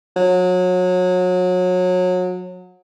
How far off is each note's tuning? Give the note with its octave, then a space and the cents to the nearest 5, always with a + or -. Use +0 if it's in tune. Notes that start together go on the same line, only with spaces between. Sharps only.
F#3 -25